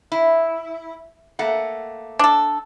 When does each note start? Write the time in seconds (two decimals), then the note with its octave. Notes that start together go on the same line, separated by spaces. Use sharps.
0.12 E4
1.39 A3 A#3 F#5
2.19 D4 A4